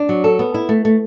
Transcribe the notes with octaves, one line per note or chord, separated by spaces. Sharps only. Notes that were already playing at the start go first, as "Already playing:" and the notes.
Already playing: D4
F#3
A4
B3
E4
A3
A3